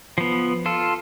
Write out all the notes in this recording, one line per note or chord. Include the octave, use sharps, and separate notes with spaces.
F3 B3
F4 A4